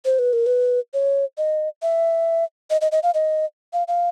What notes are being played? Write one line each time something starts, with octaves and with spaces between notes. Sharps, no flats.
C5
B4
A#4
B4
C#5
D#5
E5
D#5
D#5
D#5
F5
D#5
F5
F5